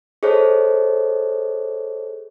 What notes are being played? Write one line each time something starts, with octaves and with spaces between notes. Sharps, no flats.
G#4 A4 C5 C#5 D#5